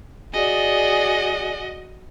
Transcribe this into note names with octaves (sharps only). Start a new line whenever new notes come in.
F#4 G#4 D5 D#5